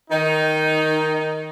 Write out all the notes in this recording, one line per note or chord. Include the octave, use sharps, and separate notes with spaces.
D#3 D#4